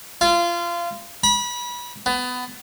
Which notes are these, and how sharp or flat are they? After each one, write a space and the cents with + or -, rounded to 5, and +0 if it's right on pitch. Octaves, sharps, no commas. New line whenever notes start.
F4 -25
B5 -30
B3 +20